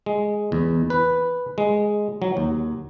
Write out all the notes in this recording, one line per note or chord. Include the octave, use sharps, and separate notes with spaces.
G#3
E2
B4
G#3
F#3
D#2